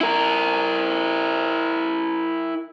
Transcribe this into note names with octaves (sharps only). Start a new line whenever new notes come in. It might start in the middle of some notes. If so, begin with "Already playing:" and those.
E4 A#4